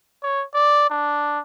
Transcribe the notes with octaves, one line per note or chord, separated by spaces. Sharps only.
C#5
D5
D4